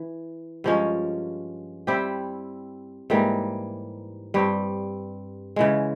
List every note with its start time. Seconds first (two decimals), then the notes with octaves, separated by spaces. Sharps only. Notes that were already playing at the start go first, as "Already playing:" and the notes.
Already playing: E3
0.64 G2 F3 G#3 C#4
1.87 G3 C4 E4 G4
3.10 G#2 E3 G3 A#3
4.34 G2 G3 C4
5.56 C#3 E3 G#3